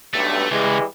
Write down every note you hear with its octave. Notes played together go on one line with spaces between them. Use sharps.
B1 G2 A3
C#2 E3 G3 G#3